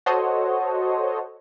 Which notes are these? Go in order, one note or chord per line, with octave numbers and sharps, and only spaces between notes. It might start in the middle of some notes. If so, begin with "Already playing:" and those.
F#4 A4 C5 C#5 D#5